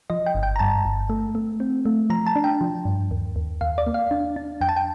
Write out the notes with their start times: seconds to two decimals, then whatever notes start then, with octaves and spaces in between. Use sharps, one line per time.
0.10 F3 D#5
0.26 G5
0.35 G1
0.43 G5
0.56 A#5
0.59 G2 A5
0.85 G1
1.10 A3
1.35 A3
1.60 C4
1.86 A3
2.10 F3 A#5
2.27 A5
2.36 D4
2.44 G5
2.61 F3
2.85 G2
3.11 D#2
3.36 D#2
3.61 D#2 F5
3.78 D5
3.87 A#3
3.94 F5
4.11 D4
4.36 D4
4.61 F2 G5
4.69 A5
4.76 G5